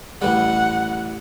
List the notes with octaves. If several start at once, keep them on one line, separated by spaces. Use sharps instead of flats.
A1 G3 F#5